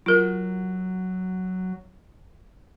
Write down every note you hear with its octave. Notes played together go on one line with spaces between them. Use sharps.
F#3 F4 A#4